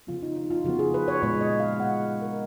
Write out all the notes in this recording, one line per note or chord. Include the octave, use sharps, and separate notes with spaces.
C#3 F3 B3 F4
D#4
D#4
F4
C#3 F3 B3 F#4
G#4
B4
C#5
A#2 G#3 B3 C#5
D#5
F5
A#2 G#3 B3 F#5
A#4